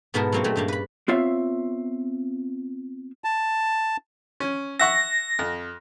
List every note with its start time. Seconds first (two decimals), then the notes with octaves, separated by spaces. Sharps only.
0.14 G#2 B2 B3 E4 A4 A#4
0.32 F#3 G3 A#3 C4 C#4
0.44 A#2 F#3 G#3 A3
0.56 G2 G3 A#3
0.68 B4 B5
1.08 B3 C4 F4 C#5 E5 F5
3.24 A5
4.40 C#4
4.79 E5 F#5 C#6 A#6
5.39 F2